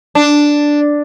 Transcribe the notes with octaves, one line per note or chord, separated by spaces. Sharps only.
D4